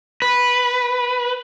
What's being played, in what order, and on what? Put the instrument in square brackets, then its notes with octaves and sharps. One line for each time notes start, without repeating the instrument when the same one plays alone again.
[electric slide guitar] B4